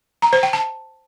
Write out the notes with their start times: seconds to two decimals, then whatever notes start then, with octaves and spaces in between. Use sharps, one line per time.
0.22 A#5
0.33 C5
0.43 G5
0.53 A5